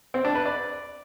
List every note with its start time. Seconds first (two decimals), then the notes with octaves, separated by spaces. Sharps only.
0.14 C4
0.25 D4
0.35 B4
0.46 D5